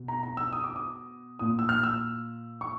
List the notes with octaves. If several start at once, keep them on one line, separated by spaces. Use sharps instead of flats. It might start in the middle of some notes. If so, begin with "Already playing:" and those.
Already playing: B2
A#5
A#5
E6
D#6
D6
D#6
A#2 D#6
E6
F6
E6
C#6